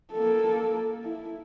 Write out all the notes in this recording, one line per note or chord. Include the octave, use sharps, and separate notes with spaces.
A#3 A4
E4